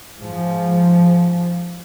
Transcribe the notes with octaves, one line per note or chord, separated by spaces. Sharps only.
G#2 F3